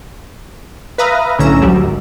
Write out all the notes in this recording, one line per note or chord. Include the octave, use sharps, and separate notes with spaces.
B4 E5 F5 A#5 D#6
B1 A2 D3 C#4 A#5 E6
D2 F#3 G3
G#1